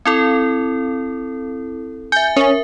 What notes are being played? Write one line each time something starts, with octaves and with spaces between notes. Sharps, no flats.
C4 E4 A4
E5 G#5 G6
C#4 A#4 E5